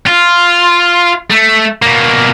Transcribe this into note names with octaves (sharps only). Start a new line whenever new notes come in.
F4
A3
B2 A#3